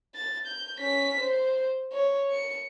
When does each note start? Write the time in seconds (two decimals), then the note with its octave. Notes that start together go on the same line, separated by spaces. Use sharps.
0.15 A6
0.47 G6
0.80 C#4 B6
1.20 C5
1.93 C#5
2.31 C#7